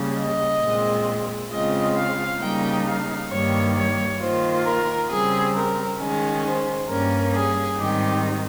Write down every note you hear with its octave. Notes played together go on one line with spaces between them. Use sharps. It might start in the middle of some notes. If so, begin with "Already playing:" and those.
Already playing: C#3 G3 A#3
D#5
A#2 G#3 C4
C#3 G#3 C4 F4 D#5
F5
C#3 G3 A#3 D#4 G5
F5
G2 D#3 G3 A#3 C#5
C#5
D#3 A#3 F4 C5
A#4
C#3 G3 C4 G#4
A#4
D#3 G#3 C#4
C5
G2 G3 A#3 C#4 A#4
G#4
G#2 D#3 G3 C4 D#4 G4